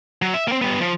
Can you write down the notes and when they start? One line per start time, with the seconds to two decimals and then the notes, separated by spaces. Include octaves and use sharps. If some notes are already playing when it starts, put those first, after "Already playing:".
0.22 F#3
0.34 E5
0.48 A#3 C4
0.62 G3 B3
0.80 F3